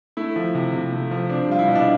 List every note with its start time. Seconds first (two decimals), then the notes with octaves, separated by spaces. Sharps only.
0.17 A3 E4
0.36 F3
0.55 C3
0.73 C3
0.92 A3
1.11 F3
1.29 C4 D4
1.48 G3 F4
1.59 E4
1.68 B2
1.75 D4